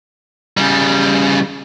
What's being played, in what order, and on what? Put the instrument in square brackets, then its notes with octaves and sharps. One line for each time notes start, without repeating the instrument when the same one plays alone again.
[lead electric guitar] C#3 G3